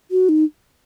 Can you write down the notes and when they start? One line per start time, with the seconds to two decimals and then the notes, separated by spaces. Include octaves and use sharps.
0.11 F#4
0.29 D#4